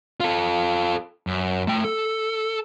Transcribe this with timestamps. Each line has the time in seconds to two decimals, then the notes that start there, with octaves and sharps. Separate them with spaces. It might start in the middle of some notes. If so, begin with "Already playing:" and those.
0.20 F4 A4
1.27 F#2
1.67 A3 G5
1.84 A4